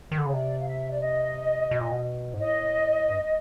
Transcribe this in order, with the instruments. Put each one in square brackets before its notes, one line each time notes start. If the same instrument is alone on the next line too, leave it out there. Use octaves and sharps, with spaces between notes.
[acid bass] D#3
D3
C#3
[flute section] C#5
[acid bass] C3 [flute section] D5
[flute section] F5
E5
D5
D#5
[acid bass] B2
A#2
B2
G#2
[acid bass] A2 [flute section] D#5
[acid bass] G2